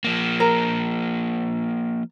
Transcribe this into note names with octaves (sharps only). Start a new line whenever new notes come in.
F3 A#3
A#4